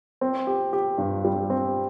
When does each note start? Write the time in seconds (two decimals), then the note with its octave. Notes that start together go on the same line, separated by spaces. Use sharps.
0.21 C4
0.47 G4
0.73 G4
0.98 G2
1.25 G3
1.50 C4